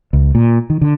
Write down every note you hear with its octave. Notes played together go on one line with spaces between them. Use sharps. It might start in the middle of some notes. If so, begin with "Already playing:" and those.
C#2
A#2
D#3
D3